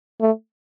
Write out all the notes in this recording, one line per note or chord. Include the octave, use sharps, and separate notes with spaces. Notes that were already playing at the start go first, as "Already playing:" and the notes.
A3